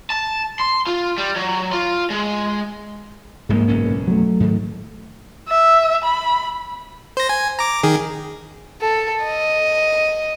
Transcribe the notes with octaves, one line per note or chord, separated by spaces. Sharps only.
A5
C6
F4
G3
F#3
F4
G#3
D1 A#1 G#2 G#3 A#3
F#1 B1 C#4
F#3 A3
G#2 D#3
E5
B5
C5 A#6
G#5
A#5 D6
D#3 G#4
A4
D#5